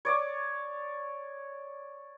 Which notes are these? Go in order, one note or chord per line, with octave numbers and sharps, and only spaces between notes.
C#5 D5 C#6 D#6